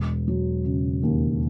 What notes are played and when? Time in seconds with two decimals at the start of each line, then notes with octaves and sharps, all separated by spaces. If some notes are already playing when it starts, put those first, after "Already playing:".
Already playing: E1
0.28 F#3
0.65 C#3
1.03 D#2